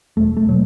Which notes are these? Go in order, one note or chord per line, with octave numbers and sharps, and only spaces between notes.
E1 A3
A3
B2 F#3